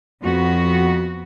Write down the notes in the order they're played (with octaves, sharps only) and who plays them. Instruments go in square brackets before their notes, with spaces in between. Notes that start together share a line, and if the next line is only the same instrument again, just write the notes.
[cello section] F2 B3 F#4